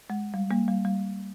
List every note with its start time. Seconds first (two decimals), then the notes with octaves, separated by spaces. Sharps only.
0.10 G#3
0.34 G3
0.51 G3 A#3
0.68 G3
0.85 G3